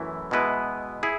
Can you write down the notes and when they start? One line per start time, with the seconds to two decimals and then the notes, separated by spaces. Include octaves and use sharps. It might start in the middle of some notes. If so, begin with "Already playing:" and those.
Already playing: F#2 E3 A3 E4
0.31 B2 G#3 B3 E4 B4
1.03 E4 G#4